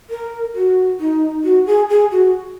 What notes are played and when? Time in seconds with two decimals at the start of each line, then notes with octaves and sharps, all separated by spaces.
0.10 A#4
0.55 F#4
1.00 D#4
1.44 F#4
1.66 G#4
1.89 G#4
2.11 F#4